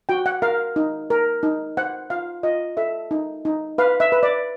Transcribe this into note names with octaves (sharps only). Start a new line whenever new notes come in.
F#4 G5
F#5
A#4 F5
D#4
A#4
D#4
C5 F#5
F4 F5
F4 D#5
A4 E5
D#4
D#4
B4 F5
E5
B4
D5